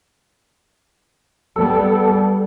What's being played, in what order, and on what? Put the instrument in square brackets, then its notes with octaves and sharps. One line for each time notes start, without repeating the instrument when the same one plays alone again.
[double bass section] G3 B3 [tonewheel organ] A4